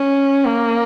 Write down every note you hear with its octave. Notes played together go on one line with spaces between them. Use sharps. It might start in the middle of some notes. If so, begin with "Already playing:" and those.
Already playing: C#4
A#3